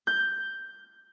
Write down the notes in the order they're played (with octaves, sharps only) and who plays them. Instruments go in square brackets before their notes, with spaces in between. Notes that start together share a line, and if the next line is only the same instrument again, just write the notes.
[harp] G6